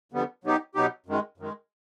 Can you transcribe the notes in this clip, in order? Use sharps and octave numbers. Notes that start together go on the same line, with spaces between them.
F2 D3 G3 B3
B2 F#3 B3 D#4 G4
B2 F#3 B3 D#4 G4
F#2 D#3 G#3
F#2 D#3 G#3